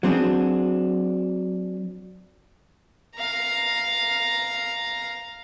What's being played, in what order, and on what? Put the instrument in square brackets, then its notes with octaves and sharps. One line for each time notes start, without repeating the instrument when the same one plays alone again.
[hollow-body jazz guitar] F#3 C4 D4 G#4
[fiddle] F5 A#5